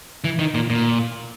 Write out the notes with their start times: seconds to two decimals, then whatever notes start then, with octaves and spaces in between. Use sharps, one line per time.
0.24 E3
0.39 D#3
0.54 A#2
0.70 A#2